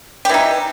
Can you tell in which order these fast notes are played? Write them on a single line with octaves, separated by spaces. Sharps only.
G4 E3 D#4